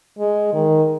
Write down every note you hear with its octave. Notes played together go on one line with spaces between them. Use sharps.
G#3
D#3